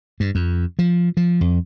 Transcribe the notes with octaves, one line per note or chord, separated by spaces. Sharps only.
G2
F2
F3
F3
F2